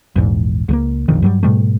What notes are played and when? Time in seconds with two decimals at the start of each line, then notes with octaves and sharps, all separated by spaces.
0.16 A#1 E2 G#2
0.68 C#2 G3 A#3
1.08 E1 A#1 F2 D#3
1.22 G2 F#3 G3
1.43 G#2 B2 G3 A3